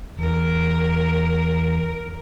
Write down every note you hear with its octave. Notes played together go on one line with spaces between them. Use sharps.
E2 A#4